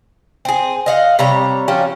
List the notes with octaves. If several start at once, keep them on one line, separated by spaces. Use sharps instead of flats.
C4 G#4
D#5 F5 F#5
C3 G3 C#5 A#5
F3 C#4 F#4 G4